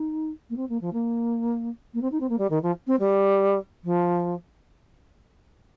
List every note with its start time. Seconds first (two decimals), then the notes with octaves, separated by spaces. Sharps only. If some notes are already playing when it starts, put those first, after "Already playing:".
Already playing: D#4
0.50 A#3
0.56 C4
0.69 A#3
0.81 F3
0.93 A#3
1.94 A#3
2.01 C4
2.11 D#4
2.20 C4
2.29 A#3
2.38 G3
2.50 D#3
2.62 F3
2.87 C4
2.99 G3
3.84 F3